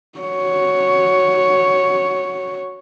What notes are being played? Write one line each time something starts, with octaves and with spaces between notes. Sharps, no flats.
F#4 C#5